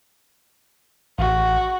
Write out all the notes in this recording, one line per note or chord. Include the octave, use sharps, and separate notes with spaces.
A1 F#4